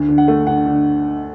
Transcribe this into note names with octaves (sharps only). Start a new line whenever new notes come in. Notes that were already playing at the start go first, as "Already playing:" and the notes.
Already playing: D2
D3
F#5
A3
D3 F#5
D3